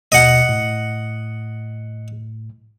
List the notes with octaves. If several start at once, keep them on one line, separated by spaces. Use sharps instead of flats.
D#2 B2 D#5 F#5
A2